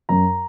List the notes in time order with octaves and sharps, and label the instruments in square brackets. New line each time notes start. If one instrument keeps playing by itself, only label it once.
[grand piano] F#2 A#5